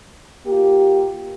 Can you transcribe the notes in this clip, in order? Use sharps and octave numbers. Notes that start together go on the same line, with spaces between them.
A#3 F4 G4